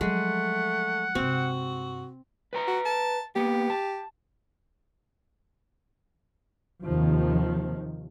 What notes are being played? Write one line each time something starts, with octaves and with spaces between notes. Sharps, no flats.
F3 F#3 G#3 A3 F#5
G2 C3 C4 F#4
B4 G5 A#5
F#4
A5
A#3 B3 G4
A5
D#2 C3 D#3 F3